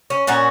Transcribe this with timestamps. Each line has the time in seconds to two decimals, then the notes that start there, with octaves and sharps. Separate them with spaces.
0.10 C#4
0.27 A#2 C#4 F#4